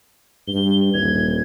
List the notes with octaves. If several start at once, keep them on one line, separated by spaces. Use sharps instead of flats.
G2 G7
D#1 G#6